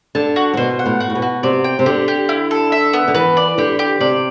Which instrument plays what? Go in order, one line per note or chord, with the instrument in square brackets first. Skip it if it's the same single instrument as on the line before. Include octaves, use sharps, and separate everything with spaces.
[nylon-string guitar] D3 [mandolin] A5
[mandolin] F#4
[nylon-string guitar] A2
[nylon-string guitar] B2 [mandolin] C5
[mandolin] F#5
[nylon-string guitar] A2
[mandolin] F#4
[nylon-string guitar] A2
B2
[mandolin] F#4
[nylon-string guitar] C3 [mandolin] D5
[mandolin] G5
[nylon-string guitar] C3
[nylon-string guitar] D3 [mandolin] G4
[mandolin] G4
E4
A4
E5
B3
[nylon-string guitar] D3
[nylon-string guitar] E3 [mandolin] B4
[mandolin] D5
[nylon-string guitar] D3 [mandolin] G4
[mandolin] G4
[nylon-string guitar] C3 [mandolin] D5